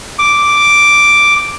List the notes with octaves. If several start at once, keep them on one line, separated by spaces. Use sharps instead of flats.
D6